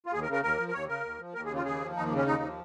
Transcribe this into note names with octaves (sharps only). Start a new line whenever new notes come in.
F4
D#2 G#4
A#4
C#3
A#4
D#2 A#4
F3
A#4
D#2 C#5
C#3 A#4
D#2
F3
D#2 A#4
G#4
C#3
F4
D#2 G#4
F3
D#2 D#4
A#3
C#3
C#4
D#2 D#4
F3